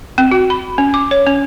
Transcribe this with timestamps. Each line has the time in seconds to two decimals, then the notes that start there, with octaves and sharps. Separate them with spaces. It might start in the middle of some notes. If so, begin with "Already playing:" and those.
0.18 C4
0.31 F#4
0.50 B5
0.78 C#4
0.94 D6
1.11 C#5
1.27 C#4